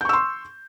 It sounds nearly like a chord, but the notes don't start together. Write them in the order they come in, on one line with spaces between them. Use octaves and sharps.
G6 C#6 E6 C6